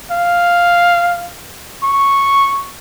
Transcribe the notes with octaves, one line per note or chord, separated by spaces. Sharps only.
F5
C#6